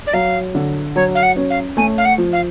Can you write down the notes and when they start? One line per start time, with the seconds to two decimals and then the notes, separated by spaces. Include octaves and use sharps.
0.07 D5
0.13 F#3 F5
0.55 D3
0.96 F#3 C#5
1.15 F5
1.23 F#5
1.36 C#4
1.50 F5
1.77 A3 G#5
1.98 F5
2.05 F#5
2.18 F3
2.33 F5